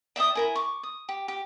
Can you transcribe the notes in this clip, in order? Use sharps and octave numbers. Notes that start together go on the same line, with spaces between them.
D5 E5 G5 D#6
E4 A#4 G#5
C#6 D6
D#6
G4
G4